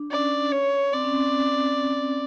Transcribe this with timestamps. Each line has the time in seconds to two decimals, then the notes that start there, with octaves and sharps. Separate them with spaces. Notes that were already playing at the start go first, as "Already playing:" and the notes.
Already playing: D4
0.10 C#4 D5
0.52 C#5
0.93 C4 D5
1.04 C#4
1.16 C4